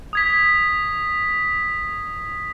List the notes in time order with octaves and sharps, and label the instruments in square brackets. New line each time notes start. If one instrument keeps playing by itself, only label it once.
[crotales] D#6 G#6 B6